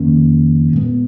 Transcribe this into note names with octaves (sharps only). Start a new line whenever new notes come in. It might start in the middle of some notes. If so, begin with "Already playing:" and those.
Already playing: F2 D#3 A#3 C#4
A#2 G#3 B3